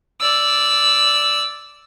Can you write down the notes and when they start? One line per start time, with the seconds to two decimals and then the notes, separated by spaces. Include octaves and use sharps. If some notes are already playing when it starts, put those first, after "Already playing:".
0.21 D5 E6